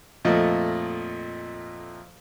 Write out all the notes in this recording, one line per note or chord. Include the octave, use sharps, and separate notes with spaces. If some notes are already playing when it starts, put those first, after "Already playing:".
F2 A#2 A3 D#5